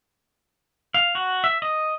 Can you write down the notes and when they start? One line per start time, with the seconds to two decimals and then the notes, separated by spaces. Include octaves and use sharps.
0.94 F5
1.15 F#4
1.44 E5
1.62 D#5